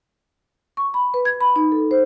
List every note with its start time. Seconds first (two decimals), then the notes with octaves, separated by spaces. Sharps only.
0.77 C#6
0.94 B5
1.14 B4
1.25 G#6
1.41 B5
1.56 D#4
1.72 A4
1.91 C5